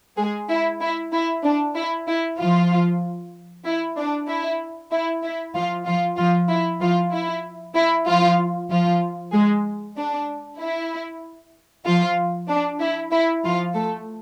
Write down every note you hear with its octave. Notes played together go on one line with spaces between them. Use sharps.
G#3 G#4
E4
E4
E4
D4
E4
E4
F3 F4
E4
D4
E4
E4
E4
F3 F4
F3 F4
F3 F4
E4
F3 F4
E4
E4
F3 F4
F3 F4
G#3 G#4
D4
E4
F3 F4
D4
E4
E4
F3 F4
A3 A4